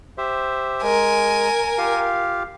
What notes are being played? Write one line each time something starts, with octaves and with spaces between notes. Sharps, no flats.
G4 C5 E5
G#3 A#4 G#5
F4 G4 F5